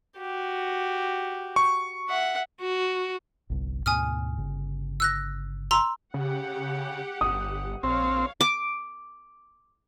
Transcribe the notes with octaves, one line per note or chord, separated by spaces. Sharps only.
F#4 G4
C#6
E5 F#5
F#4
G1 C2
D2 G#2 B2 G#5 D#6 F6
G1 C#3
E6 F#6 A#6
A#5 C6 E6
C#3 G4 F#5
G1 D#6
A#1 C4 C#5 F5
D6